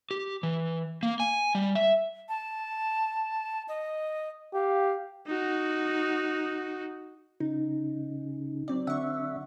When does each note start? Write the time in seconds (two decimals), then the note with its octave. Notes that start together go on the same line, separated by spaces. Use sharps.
0.11 G4
0.43 E3
1.03 A#3
1.20 G#5
1.55 G3
1.75 E5
2.29 A5
3.68 D#5
4.54 G4 F5
5.27 D#4 F#4
7.40 C#3 D#4
8.68 F#3 C4 D5
8.87 D3 E5 F#5 C#6